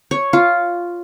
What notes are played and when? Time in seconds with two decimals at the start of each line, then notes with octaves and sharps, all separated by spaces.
0.11 C#5
0.33 F4